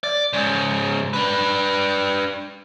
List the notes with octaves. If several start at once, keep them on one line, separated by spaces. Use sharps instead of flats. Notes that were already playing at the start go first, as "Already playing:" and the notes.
D5
G#2 C#3
D4 B4